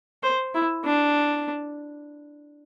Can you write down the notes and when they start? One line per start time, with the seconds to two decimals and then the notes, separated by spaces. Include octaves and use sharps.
0.23 C5
0.54 E4
0.85 D4